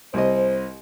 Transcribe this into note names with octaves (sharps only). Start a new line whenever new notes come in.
C2 C3 C5 D#5